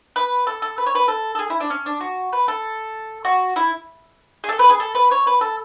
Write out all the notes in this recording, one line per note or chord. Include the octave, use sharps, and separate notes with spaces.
B4
A4
A4
B4
C#5
B4
A4
A4
G#4
E4
D4
C#4
D4
F#4
B4
A4
F#4
E4
G#4
A4
B4
G#4
A4
B4
C#5
B4
A4